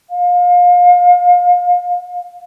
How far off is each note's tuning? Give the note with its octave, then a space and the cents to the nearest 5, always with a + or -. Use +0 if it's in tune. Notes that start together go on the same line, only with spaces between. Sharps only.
F5 +30